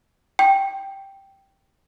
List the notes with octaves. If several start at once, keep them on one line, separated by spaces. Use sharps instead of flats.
G5